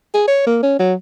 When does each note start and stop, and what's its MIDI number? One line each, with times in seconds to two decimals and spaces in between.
0.14 0.23 68
0.27 0.42 73
0.46 0.59 58
0.63 0.76 61
0.79 0.94 54